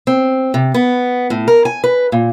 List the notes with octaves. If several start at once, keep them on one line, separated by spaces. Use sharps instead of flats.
C4
C3
B3
A2
A#4
G#5
B4
A#2